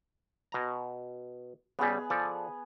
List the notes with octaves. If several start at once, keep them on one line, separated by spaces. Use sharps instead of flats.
B2 A#5
C#3 G3 B3 G#4
F3 A4 D5